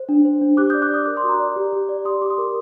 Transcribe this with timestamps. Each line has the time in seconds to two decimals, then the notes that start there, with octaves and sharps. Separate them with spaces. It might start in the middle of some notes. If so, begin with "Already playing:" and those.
Already playing: C5
0.09 D4
0.25 C5
0.41 D4
0.57 G4 D6 F#6
0.70 D5 D#6 G6
0.82 D6 F#6
0.90 D5 D#6
1.06 A#4 D6
1.17 C6
1.23 F#4
1.28 A#5 D6
1.40 D5
1.56 G4
1.73 G4
1.89 D5
2.05 G4 C6 D#6
2.22 G4 D6
2.30 C6 D#6
2.38 A#4